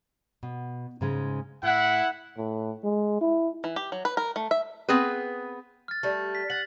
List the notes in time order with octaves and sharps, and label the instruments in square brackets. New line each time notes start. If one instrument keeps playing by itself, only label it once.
[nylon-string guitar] B2
G#2 C#3 G#3
[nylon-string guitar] A2 [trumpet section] E4 F#5
[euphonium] A2
G#3
E4
[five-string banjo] E3
G4
F#3
B4
A#4
A3
E5
[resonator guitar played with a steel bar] B3 C4 G#4 B4
[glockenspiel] F6 A6
[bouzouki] G3 A3
[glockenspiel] B6
[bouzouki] F#5 [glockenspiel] A6 F#7